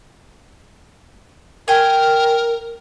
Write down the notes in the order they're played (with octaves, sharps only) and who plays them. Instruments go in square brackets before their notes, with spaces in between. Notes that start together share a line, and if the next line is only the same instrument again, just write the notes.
[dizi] A#4 [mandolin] G5 G#5